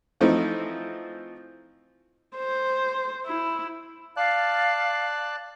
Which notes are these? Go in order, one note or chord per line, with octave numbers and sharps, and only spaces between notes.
E3 F3 A3 C4 D#4 E4
C5
E4
D5 F5 A5 F#6